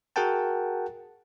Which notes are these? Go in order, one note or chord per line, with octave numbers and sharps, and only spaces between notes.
F#4 G#4 A#4 F#5 G5 A5